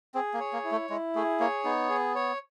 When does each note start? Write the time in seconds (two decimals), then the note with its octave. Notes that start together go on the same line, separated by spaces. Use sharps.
0.14 C4 G#4
0.34 A#3
0.40 C#5
0.53 A#3
0.64 E4
0.71 A3
0.90 G#3 E4
1.15 A3 G#4
1.40 A#3 C#5
1.65 B3 D#4
1.89 G#4
2.15 C#5